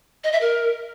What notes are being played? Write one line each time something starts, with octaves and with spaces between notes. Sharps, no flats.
D#5
E5
A#4